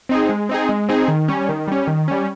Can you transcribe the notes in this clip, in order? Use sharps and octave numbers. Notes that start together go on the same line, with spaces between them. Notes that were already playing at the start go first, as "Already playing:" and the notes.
C4 D#4 G#4
G#3
C4 D#4 G#4
G#3
C4 D#4 G#4
D#3
G3 C#4
D#3
G3 C#4
D#3
G3 C#4